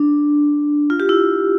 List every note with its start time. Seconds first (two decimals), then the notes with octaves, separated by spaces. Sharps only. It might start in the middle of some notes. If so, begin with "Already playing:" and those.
Already playing: D4
0.90 F4
1.00 G4
1.09 E4